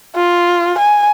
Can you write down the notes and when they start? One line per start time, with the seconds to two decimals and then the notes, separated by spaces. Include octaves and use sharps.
0.15 F4
0.78 G#5